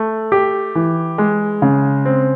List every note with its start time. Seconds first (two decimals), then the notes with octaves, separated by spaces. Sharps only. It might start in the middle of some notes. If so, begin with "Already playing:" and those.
Already playing: A3
0.32 G4
0.75 E3
1.18 G#3
1.62 C#3
2.05 C4